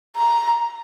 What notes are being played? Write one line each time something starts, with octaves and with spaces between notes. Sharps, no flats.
A#5